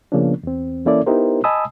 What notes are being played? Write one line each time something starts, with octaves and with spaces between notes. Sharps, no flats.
C#3 F3 A#3 B3 C#4 D4
E2 C4
E3 A#3 C#4 E4 A4 D5
B3 D#4 E4 G4 A#4 C5
D#5 G#5 A5 B5 D#6 E6